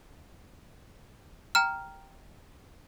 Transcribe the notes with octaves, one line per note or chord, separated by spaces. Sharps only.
G5 A#5 F6